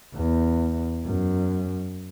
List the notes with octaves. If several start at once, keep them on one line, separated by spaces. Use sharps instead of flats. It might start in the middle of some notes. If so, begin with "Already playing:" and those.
E2
F#2